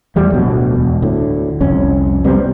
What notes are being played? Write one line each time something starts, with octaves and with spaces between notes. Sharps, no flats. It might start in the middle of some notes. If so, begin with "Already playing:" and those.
E2 F3 G3 A3
D1 D2 B2 F#3
E1
D2 A2
C2 F2 C#4
C3 G3 B3 C4